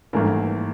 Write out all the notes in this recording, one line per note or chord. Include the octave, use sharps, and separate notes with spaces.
G#1 G2 E3 A3 A#3 A#4